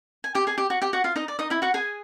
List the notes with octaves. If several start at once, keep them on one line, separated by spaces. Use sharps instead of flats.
G#5
G4 G5
G#4 G#5
G4 G5
F#4 F#5
G4 G5
F#4 F#5
F4 F5
D#4 D#5
D5
D#4 D#5
E4 E5
F#4 F#5
G#4 G#5